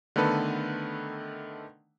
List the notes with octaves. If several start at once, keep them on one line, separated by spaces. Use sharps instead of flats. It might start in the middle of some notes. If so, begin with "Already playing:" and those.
D3 D#3 A3 B3 A4 B4